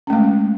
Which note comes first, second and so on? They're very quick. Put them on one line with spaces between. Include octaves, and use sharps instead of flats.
C#4 A3 G#3